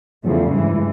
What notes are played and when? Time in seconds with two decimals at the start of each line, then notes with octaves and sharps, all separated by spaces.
0.23 E2 C#3 F3 A3
0.54 G2 E3 G#3